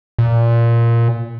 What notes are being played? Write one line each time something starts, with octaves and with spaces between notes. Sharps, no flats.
A#2